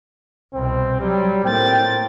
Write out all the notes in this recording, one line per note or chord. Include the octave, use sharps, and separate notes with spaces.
C2 B2 C4
F#3 G3
A2 A#3 C4 G5 A6